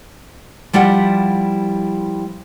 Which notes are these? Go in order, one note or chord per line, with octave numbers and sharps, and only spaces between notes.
F3 G3 E4 G4 F#5